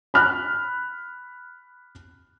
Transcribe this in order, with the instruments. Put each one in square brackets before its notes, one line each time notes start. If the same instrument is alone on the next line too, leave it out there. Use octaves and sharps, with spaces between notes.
[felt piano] B5 F6 F#6